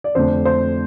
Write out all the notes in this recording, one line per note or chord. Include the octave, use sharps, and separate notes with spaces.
D5
F2 D3 A3 D4 C5
C5